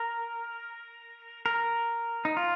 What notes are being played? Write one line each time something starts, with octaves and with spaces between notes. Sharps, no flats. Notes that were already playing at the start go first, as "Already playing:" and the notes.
Already playing: A#4
A#4
D#4
F4